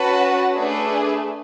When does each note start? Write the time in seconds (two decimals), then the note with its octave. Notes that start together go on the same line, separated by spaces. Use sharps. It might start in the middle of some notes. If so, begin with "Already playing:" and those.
Already playing: C#4 F#4 B4 F#5 A5
0.53 A3 D4 G#4 B4